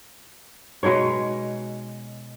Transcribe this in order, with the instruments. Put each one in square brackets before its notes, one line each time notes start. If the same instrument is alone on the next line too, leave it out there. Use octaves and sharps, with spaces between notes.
[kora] B2 G#3 D#4 C#5